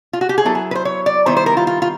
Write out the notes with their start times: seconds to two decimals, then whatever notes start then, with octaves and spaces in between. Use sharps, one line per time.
0.13 F4
0.21 F#4
0.29 G4
0.38 G#4
0.45 F#3 B3 E4 A4
0.55 G#4
0.71 B4
0.75 C5
0.85 C#5
1.06 D5
1.26 D#3 G3 B3 E4 C5
1.37 C5
1.46 A#4
1.57 F4
1.67 F4
1.82 F4